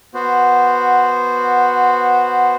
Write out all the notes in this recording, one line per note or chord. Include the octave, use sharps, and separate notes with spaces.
B3 F#4 C5